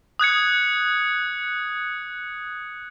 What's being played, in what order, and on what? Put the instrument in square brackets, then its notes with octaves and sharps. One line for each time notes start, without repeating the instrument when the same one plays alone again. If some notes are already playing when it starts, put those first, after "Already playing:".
[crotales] D#6 F#6 G#6 C#7